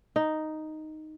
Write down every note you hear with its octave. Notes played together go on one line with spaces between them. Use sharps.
D#4